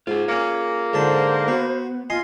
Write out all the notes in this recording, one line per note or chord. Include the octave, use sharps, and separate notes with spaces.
G#2 F4 G#4
A#3 C#4 C#5
G#2 D3 C5 A5
B3 F#4
F4 D#5 G#5 C6